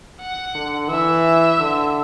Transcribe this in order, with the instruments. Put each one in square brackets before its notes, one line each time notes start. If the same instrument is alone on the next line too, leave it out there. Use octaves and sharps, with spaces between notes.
[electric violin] F#5
[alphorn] D3
[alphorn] E3 [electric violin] E5
[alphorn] D3